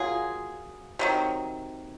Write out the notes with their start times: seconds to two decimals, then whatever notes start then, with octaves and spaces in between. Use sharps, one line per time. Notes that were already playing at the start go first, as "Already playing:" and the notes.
Already playing: F#3 A#3 F4 G#4
0.99 C3 D#3 F#3